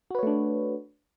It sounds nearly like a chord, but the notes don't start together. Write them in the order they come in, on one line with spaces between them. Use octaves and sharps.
F#4 B4 C#5 A3 D4